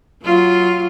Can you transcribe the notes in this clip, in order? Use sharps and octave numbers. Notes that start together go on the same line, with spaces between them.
F#3 F4